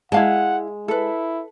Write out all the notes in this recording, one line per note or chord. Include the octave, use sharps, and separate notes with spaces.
G#3 E4 F5 F#5 A5
E4 A4 B4